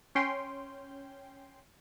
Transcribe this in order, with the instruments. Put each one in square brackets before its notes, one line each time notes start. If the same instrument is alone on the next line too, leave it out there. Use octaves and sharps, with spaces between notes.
[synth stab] C#4 G5 C6